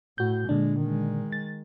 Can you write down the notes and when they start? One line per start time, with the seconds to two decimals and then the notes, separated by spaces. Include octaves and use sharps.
0.18 A2 F#4 G6
0.49 A#2 D3 G#3 D4
0.80 D#3 G#3
1.32 A6